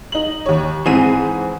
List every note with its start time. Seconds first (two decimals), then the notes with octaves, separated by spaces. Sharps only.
0.12 D#4 F#7
0.46 D#2 C#5
0.86 G#2 E3 C4 G#4 D#7